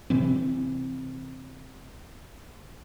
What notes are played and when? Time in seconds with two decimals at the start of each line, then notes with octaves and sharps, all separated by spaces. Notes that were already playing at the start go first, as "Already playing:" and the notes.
0.10 C3 E3 C4